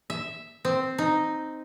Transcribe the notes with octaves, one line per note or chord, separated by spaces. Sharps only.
E5
C4
D#4